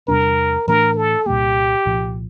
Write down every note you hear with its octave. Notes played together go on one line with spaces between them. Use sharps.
E2 C3 G3 D4 A#4
A2 E3 A3 D4 A#4
A4
C2 A#2 G3 A#3 G4
C2 A#2 F3